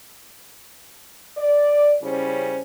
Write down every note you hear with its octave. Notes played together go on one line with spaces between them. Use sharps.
D5
C#3 G3 C#4 E4 C5